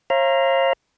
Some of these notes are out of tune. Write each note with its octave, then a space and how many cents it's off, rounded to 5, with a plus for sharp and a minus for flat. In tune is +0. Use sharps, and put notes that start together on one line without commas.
C#5 -45 F5 -35 A#5 +5